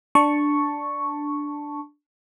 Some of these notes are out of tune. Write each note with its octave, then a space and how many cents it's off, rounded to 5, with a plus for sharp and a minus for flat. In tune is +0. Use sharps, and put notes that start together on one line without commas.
D4 +0 A5 +0 C#6 +0